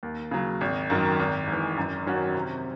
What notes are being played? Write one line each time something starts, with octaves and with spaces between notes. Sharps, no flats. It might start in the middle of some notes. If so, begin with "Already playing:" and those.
D#2
C#3 F#3
G#1
F#2 D#3 F#3
G#1
G#2 E3
F#2
D#3 F#3 C#4 F#4
C3